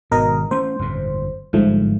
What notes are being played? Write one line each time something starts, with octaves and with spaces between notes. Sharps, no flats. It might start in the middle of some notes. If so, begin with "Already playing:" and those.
G#1 B2 D#3 A#4 D#5
A3 C#4 C5
G1 F2 A2
G1 G#2 F3 G3 A3